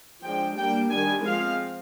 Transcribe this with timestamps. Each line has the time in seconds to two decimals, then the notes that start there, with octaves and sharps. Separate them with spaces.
0.23 F3 G#3 D4 G5
0.57 G3 A#3 D4 G5
0.91 D#3 G3 D4 G#5
1.24 F3 G#3 C4 F5